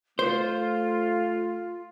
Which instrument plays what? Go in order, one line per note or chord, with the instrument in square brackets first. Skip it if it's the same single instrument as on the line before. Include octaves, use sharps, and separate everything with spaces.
[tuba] A3 [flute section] F4 [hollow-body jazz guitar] C5